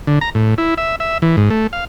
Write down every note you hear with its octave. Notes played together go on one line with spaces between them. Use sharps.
D3
A#5
A2
E4
E5
E5
E3
G#2
A3
F5